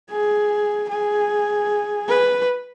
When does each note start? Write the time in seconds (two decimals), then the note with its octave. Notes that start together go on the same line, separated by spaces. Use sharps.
0.10 G#4
0.89 G#4
2.08 B4